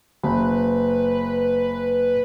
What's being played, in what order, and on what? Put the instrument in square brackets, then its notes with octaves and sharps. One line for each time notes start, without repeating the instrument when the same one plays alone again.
[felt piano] F#1 [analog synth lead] B4